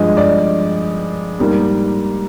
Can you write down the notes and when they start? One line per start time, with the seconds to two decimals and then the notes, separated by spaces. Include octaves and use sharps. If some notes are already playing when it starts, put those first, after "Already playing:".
Already playing: G2 F3 G#3 D#5
0.17 D5
1.39 G#2 G3 A#3